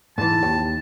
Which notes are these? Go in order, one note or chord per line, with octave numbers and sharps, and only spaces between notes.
G#2 E3 A5
D#2